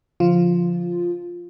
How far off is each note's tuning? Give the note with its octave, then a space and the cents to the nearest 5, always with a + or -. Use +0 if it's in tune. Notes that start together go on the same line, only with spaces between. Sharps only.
D3 -35 F3 +0 F4 +0